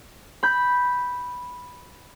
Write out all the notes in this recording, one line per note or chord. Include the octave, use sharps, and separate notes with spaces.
B5 G6